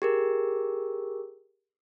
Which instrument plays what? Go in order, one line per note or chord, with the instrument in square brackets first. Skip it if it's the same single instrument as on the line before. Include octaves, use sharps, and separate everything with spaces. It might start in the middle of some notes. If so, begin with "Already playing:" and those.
[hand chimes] G4 G#4 A#4